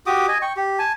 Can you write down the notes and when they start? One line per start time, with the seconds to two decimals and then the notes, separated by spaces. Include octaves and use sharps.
0.07 F#4 G4 D6 D#6
0.28 D#5 G#5
0.42 G5 C#6
0.56 G4
0.79 G#5 A5